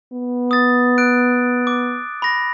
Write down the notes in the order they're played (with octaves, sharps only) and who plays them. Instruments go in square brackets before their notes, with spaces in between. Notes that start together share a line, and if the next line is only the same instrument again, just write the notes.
[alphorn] B3
[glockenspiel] D#6 A6
F#6 D7
D6
B5 A#6